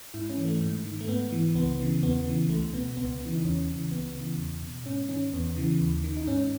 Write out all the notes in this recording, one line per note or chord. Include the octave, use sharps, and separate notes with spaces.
G#2 E4
C#4
E3
A3
G#2
D#3
A3
G#2 B3
E3
C#2 B3
C#3 E3
E2 B3
C#3 E3
C#2 A3
B2 B3
C#2 B3
C#3 E3
D#4
E2 C#4
C#3 E3
C#2 B3
C#3 E3
E2
B2
G#2 C#4
D#3 C#4
E2 B3
C#3 E3
D#2
D#3
D#4
G#2 C#4